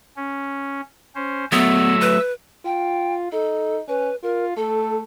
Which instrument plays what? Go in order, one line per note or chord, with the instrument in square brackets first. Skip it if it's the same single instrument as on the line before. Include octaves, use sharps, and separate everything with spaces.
[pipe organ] C#4
C#4 C5
[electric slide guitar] F#3 A3 [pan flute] B3 [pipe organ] E5 E6
[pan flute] B4
[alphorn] F4 [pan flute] G5
[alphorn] D#4 [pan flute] A4
[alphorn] C#4 [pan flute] B4
[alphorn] F4 [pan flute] A#4
[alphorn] A3 [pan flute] A4